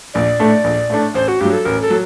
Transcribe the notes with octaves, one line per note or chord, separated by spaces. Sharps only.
A#1 D5
A2 A3 D4
A#1
A2 A3 D4
A1 C5
F#4
G2 F#3 G4
A4
A1 A#4
A4
F#3